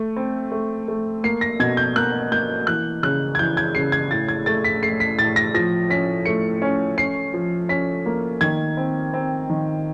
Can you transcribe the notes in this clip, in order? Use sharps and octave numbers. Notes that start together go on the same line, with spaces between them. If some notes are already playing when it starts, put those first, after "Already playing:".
Already playing: A3
C4
A3
A3
A#3 C7
A#6
B2 G#6
G6
A#3 F#6
A#3 G6
E3 F#6
C#3 F#6
G#6
E3 G6
G#6
C#3 C7
G#6
A2 A6
G#6
A3 A6
B6
A3 C7
B6
A2 A6
A#6
F3 A#6
C#4 B6
A3 C#7
C#4
C#4 C7
F3
C#4 B6
A#3
D#3 G#6
C4
C4
D#3